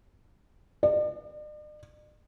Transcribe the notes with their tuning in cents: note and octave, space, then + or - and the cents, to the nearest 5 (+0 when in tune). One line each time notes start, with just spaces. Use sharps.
D5 +45